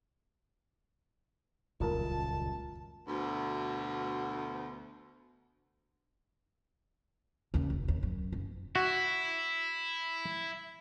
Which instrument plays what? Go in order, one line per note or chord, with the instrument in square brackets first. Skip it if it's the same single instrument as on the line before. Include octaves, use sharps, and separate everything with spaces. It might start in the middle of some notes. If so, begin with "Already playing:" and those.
[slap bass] D#1 C#2 F#2 [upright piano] F4 A#4 [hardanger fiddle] A5
[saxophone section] D2 B2
[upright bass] D#2 C#3
F1
D#2
F#2
F#1
[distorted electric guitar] E4 [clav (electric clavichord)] F#4